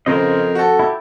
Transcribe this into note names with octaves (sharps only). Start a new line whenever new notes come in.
F2 C#3 A#4 C5 D#5
F#4 A4
E4 G4